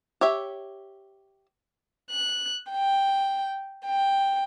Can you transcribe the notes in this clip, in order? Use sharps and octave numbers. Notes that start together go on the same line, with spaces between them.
G4 C#5 E5
F#6
G5
G5